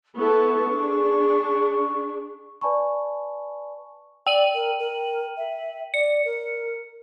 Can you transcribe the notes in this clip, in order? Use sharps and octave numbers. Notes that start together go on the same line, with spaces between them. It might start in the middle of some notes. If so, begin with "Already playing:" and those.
B3 E4 A4 C#6
D4 G#4
B4 D5 G#5 A5 B5 C#6
D5 G5 D#7 F#7
A#4
A#4
E5
D5 C#7
A#4